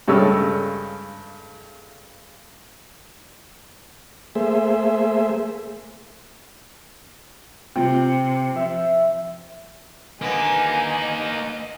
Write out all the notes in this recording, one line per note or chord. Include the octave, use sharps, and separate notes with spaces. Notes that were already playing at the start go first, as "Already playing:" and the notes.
G2 C#3 G#3 A3 C#5 E6
A3 A#3 G#4 C5 E5
C3 C4 F4 G5
F3 E5
D3 A#3 B3 D#4 D#5 G#5